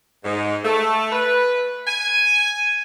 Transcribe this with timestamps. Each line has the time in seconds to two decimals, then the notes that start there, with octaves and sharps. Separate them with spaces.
0.24 G#2
0.65 A3
1.12 B4
1.87 G#5